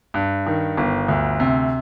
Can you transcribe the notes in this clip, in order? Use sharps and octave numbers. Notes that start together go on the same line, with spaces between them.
G2
D#3
G1
D2
C3